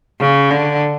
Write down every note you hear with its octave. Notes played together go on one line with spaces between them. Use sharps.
C#3
D3